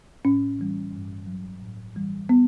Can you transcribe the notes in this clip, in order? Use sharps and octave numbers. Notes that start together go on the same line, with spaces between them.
A2 C#4
E3 G3
G2
F#3
A2
E3 G3
B3